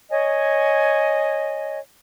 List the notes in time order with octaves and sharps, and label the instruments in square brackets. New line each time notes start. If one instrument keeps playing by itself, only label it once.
[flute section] C#5 D#5 G#5